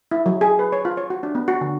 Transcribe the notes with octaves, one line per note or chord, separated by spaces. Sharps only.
E4
F#3
G#4
B4
C#5
F4
C#5
F#4
D4
B3
F#4
D3